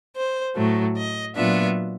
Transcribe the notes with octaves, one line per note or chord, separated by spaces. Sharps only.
C5
A2 F#3 A3
D#5
A#2 F#3 B3 D4 F4 E5